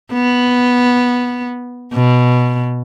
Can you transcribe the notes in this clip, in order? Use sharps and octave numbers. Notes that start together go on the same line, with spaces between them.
B3
B2